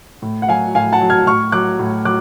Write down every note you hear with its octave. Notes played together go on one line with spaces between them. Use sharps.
A2
F#5
F#3 F5 G#5
A2 F5 G#5
F#5 A5
F#3
F6 G#6
A2 C#6 F6
F#3 D6 F#6
A2
F#3 D6 F#6